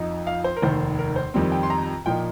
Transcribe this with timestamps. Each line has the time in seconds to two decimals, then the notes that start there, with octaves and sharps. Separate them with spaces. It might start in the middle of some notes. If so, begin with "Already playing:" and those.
Already playing: F2 F3 D#4
0.27 F5
0.44 C5
0.56 A#4
0.62 F1 D#2 D#3 C5
0.98 A#4
1.16 C5
1.34 F2 D#3 G3 C4
1.52 G5
1.63 C6
1.70 A#5
2.06 A#2 F3 A#3 D#4 G5